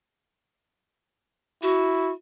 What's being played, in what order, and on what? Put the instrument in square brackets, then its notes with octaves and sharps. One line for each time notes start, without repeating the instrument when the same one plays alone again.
[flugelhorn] E4 [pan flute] F#4